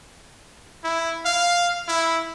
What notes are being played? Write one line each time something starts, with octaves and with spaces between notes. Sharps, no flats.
E4
F5
E4